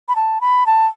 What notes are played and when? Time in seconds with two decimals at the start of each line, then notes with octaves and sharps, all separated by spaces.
0.09 B5
0.16 A5
0.41 B5
0.66 A5